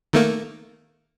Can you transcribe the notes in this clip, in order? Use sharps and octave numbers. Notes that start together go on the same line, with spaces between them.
D#3 A3 A#3